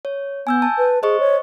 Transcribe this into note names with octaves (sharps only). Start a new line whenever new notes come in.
C#5
B3 G#5 E6 G6
A5
B4
G#4 C5 D#5 C#6
C#5